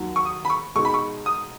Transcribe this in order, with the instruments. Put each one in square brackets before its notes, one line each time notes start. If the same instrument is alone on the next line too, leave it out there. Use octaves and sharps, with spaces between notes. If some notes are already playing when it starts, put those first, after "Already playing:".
Already playing: [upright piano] D#2 D#3 F#3
[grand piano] C#6
D#6
B5
C#6
[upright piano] B2 G#3 D#4 [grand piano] C#6
[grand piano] B5
C#6
D#6